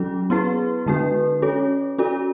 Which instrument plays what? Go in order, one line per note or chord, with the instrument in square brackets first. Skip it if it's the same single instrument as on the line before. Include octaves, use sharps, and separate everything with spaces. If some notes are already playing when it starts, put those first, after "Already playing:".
Already playing: [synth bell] F#3 C#4 F#4 A4
B3 E4 G#4 B4
D3 G#3 D4 F#4 B4
C#4 F#4 A4 C#5
C#4 F#4 A4 D5